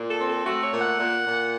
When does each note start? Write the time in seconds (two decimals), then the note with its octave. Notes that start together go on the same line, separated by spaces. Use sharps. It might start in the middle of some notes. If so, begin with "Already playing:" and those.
Already playing: A#2
0.10 A4
0.19 C4
0.29 A4
0.45 A3 F#4
0.64 C#5
0.72 A#2
0.81 F#5
0.99 A#2
1.25 A#2